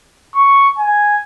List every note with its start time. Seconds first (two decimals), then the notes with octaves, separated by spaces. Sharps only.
0.36 C#6
0.78 G#5